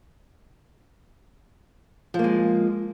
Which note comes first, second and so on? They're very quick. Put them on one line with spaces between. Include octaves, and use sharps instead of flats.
F3 A#3 G#3